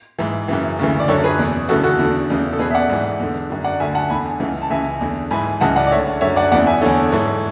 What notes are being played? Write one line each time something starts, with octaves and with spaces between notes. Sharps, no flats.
G#2 E3
F#2 C#3 E3
D2 C#3 E3
D5
F#2 D3 A4 C#5
G#4 B4
E2 B2
D2 C#3 E3 F#4 A4
F#4 A4
E2 D3
E2 C#3 E3
A4
E2 B2 G#4 B4
E5
D5 F#5
G#2 E3
E2 D3
F#2 D3
D5 F#5
D2 D3 E5 G#5
F#5 A5
E2 D3 G#5 B5
C#2 C#3 E3
A5
C#2 C#3 E3 E5 G#5
E2 D3
G#2 E3 G#5 B5
C#2 C#3 E3 F#5 A5
D5 F#5
D5
D2 D3 C#5 E5
F#2 D3 C#5 E5
D5 F#5
E2 C#3 E3 D5 F#5
E5 G#5
E2 D3 A4 C#5
G#2 E3 A4 C#5